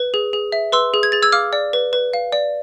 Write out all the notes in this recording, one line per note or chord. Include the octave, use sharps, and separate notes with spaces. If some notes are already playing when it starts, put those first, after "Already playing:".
Already playing: B4
G#4
G#4
E5
B4 C6 E6
G#4
G#6
G#4 A6
E6 G#6
F5 D6 F6
D5
B4
B4
F5
D5